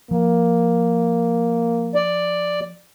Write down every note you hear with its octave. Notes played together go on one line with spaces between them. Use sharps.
F3 A#3
D5